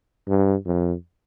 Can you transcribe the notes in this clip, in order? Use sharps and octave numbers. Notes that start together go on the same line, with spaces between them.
G2
F2